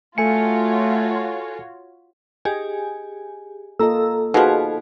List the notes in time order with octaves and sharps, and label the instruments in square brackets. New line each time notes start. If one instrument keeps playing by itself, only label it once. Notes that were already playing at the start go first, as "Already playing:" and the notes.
[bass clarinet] A3 [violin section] F4 F#4 C#5 [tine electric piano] A4 G#5 C#7
[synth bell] G4 G#4 G#5 [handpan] D#5
[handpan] A#3 F4 D#5 [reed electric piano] A4 [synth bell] A#5 E6
[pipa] B2 F3 [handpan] D#4 F4 F#5 [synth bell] F#4 G#4 B4